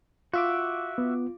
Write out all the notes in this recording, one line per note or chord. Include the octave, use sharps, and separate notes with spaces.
F4 F#4 E5 D6
B3